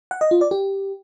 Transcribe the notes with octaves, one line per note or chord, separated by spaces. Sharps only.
F#5
D#5
F4
D5
G4